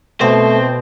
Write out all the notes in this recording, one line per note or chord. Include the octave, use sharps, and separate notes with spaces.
B2 A3 C4 C5